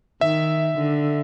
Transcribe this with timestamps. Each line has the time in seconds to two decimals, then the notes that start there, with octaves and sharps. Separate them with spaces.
0.21 D#3 E5
0.77 D3